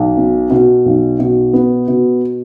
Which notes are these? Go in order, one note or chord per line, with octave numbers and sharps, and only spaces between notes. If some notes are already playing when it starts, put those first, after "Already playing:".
Already playing: B1
B2
B2
B1
B2
B3
B2